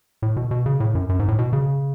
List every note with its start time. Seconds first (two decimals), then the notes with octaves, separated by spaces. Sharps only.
0.22 A2
0.37 B2
0.51 B2
0.66 C#3
0.80 A2
0.95 F#2
1.09 F#2
1.19 G#2
1.28 A2
1.39 B2
1.53 C#3